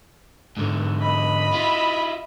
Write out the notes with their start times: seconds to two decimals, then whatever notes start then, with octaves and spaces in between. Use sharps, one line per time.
0.57 G#2 D3
1.01 D#5 B5
1.53 E4 F4